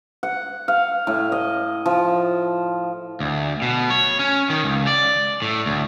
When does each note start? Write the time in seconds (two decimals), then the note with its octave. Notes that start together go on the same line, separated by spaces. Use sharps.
0.23 F#5
0.68 F5
1.07 A2
1.32 D#5
1.86 F3
3.20 D2
3.62 B2
3.90 C#5
4.19 C#4
4.50 D#3
4.64 C#2
4.87 D5
5.42 A2
5.66 D2